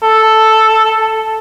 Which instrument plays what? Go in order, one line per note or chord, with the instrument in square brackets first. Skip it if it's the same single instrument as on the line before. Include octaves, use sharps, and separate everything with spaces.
[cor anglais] A4